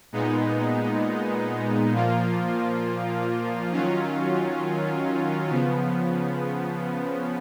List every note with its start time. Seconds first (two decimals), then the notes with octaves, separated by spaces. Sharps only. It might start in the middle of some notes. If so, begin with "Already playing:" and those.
0.12 A#2 G#3 B3 D#4
1.91 A#2 F3 A#3 F4
3.71 D#3 F#3 C#4 F4
5.50 C#3 F3 B3